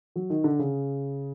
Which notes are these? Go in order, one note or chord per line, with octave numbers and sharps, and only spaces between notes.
F#3
D#3
D3
C#3